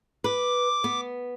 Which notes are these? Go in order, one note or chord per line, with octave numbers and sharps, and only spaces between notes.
B4 D6
B3